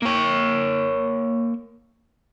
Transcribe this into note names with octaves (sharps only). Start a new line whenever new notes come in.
A#3 C#5